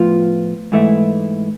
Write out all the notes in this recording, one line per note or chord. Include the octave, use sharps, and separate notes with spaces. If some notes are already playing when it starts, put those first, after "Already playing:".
Already playing: A2 F3 B3 F4
G#2 E3 A3 E4